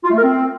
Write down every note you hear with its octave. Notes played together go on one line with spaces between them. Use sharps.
F4
A3
A#4
C4